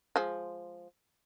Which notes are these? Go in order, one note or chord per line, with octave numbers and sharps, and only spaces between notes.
F3 G#3